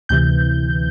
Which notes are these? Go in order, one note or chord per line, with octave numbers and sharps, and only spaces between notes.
D2 C3 E3 G6